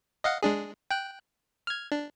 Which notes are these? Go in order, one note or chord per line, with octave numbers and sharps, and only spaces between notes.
D#5 F5 F#5
G#3 D4 G#4
G5 F#6
F6 G#6
D4